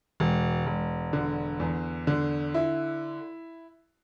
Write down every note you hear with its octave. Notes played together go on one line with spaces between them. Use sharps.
E1
E1
D3
E2
D3
E4